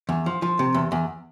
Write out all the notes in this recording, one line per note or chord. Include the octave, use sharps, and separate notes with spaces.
E2
F3
F3
C3
E2
E2